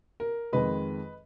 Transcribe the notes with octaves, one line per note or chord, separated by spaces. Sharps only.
A#4
F2 D#3 G#3 B4 D#5